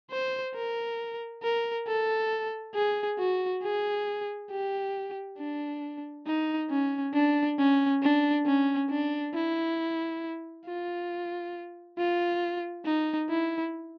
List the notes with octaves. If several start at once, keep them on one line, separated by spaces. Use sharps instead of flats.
C5
A#4
A#4
A4
G#4
F#4
G#4
G4
D4
D#4
C#4
D4
C#4
D4
C#4
D4
E4
F4
F4
D#4
E4